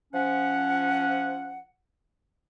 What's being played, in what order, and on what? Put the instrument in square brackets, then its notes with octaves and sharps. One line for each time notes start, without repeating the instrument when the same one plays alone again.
[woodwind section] F3 C#4 F#5